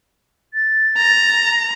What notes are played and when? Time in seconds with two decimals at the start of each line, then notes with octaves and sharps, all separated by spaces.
0.54 A6
0.97 A#5